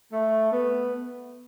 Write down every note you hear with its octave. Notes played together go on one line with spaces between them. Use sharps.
A3
B3